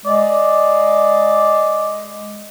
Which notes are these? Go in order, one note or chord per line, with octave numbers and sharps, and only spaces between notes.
G#3 D5